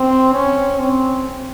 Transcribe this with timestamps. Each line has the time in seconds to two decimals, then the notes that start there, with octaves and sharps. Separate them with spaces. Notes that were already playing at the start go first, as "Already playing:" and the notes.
Already playing: C4
0.33 C#4
0.79 C4